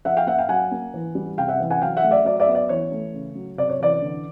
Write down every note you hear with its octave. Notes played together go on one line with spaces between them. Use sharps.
F3 E5 F#5
F5 G5
A#3 E5 F#5
F5 G5
F#3 F#5 G#5
A#3
E3
G3
C3 F5 G5
E5 F#5
E3
F#5 G#5
F#3 F5 G5
E5 F#5
A3
D5 E5
F#3 D5
D5 E5
B3
D5
E3 C#5
A3
C#3
F#3
C3 D5
C#5
E3 D5
D3